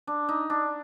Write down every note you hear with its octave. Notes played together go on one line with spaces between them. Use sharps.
D4
D#4
D4